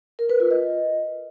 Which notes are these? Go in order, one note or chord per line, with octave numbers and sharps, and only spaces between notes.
A#4
B4
F4
D#5